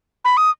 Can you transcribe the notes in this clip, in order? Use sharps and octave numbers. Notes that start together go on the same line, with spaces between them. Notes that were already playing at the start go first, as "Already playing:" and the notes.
B5
D#6